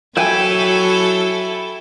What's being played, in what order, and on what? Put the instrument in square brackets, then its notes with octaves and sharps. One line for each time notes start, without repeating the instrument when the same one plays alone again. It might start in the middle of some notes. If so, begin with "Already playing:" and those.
[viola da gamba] F#3 [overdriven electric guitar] E4 E5 [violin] A4 [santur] G5 G#5